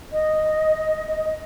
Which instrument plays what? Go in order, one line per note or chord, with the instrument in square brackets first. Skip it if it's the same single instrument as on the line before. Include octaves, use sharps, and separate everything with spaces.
[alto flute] D#5